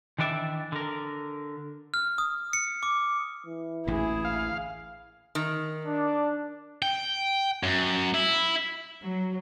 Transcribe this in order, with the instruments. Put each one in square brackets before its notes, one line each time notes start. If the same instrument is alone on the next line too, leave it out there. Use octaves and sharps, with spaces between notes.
[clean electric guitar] D#3 E3 D4 D5 E5
D3 A#4
[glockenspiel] F6
D#6
C#7
D6
[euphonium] E3
[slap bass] A1 D2 A#2 [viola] E4 G#4
[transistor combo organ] F5
[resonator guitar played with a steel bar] D#3
[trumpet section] D4
[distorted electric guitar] G5
F#2
E4
[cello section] F#3